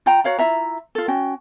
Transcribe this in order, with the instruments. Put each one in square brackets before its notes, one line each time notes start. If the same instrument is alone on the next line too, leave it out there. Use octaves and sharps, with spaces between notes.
[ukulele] F4 G5 A#5
F#4 C#5 F5 A#5
E4 F4 E5 A#5
F4 A4
C#4 F#4 G5